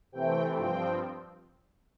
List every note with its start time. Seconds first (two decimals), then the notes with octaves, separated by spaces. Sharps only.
0.12 C3 E3 A3 C4 G5
0.57 G2 F3 C4 G5